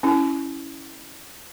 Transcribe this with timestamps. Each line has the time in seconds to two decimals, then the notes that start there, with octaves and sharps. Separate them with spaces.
0.03 C#4 E4